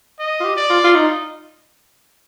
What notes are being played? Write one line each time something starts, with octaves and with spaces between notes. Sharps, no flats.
D#5
F4
G4
D5
F4
F4
D#4